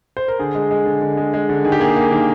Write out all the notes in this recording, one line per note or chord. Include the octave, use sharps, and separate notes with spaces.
C5
A#4
D3 G#4
G#3
G#3
D3
D3
G#3
G#3
D3
D#3 G#4
G4
A#3 G#4
A#3
D#3